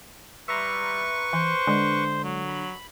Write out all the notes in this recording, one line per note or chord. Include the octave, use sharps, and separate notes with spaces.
G3 B4 E5 A#5 C6 C#6
E3 C5
D3 G#3
F#3
B5